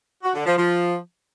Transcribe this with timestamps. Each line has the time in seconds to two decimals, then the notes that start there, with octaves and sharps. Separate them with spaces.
0.23 F#4
0.35 D3
0.46 F3
0.57 F3